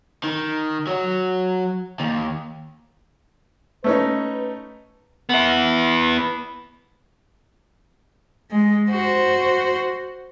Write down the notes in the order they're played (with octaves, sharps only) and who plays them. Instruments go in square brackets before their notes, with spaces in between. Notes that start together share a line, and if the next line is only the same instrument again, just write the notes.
[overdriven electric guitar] D#3
F#3
D#2
[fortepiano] A3 C#4 D#4 [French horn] B4
[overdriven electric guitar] B3 E4
[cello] G#3
F#4 C5